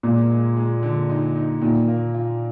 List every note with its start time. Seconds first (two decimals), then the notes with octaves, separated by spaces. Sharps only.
0.03 A#2 G#3
0.30 G#3
0.57 G#3
0.83 D3
1.10 D#4
1.35 D#4
1.61 A#2 D#3
1.88 A#3
2.14 F4